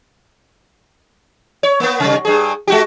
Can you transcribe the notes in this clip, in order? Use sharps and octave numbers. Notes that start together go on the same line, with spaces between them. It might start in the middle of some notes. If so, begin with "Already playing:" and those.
C#5
A#3 B3
C3 G3
G2 G#4
G#3 F#4 G4